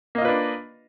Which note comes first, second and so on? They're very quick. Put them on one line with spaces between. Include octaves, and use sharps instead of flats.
A#3 D#5 F4 B4 D4